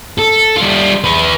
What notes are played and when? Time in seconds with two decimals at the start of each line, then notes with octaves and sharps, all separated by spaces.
0.19 A4
0.57 G3 F4
1.04 G#4 B4